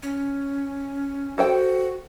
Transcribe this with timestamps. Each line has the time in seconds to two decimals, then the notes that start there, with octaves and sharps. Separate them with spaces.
0.02 C#4
1.38 F#4 A4 C5 G5